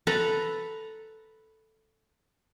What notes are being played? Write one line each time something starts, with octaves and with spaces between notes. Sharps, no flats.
A4 B4 A#5